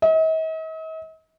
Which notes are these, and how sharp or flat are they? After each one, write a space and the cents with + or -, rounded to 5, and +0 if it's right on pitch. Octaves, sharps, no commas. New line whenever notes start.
D#5 +45